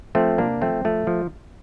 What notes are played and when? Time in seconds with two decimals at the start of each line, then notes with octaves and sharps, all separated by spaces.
0.15 F3 A3 C4
0.38 C3 A#3 D4
0.61 F3 A3 C4
0.85 F3 A3
1.07 F3